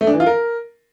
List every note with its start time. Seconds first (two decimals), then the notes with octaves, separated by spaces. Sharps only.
0.01 A3
0.07 D4
0.14 E3
0.20 F4
0.26 A#4